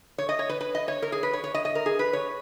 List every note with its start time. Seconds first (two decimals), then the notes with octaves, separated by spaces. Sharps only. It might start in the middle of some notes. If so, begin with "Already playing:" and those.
0.18 C#5
0.29 D#5
0.39 C#5
0.49 B4
0.61 B4
0.75 D#5
0.88 C#5
1.02 A#4
1.12 G#4
1.23 B4
1.33 C#5
1.44 C#5
1.54 D#5
1.65 D#5
1.75 A#4
1.86 G#4
1.99 B4
2.13 C#5